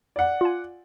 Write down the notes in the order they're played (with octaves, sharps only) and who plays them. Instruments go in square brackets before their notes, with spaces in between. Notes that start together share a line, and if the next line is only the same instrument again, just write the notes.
[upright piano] D5 F#5
[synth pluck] F4 G#5